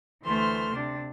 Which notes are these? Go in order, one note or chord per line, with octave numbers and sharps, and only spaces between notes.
D2 E3 A3 C5 C6 F6
C3 D4